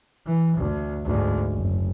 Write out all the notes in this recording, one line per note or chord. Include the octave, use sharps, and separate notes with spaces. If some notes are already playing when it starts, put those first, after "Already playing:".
E3
D2
D2 G#2
F#1